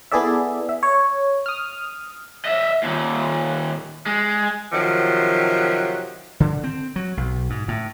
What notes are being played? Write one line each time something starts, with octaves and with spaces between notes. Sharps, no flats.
B3 E4 G#4 A4 D5 E5
E5
C#5
D#6 F6
D#5 E5
D#2 A#2
G#3
C3 D#3 F3 F#3
D3
C4
F#3
B1
G#2
A2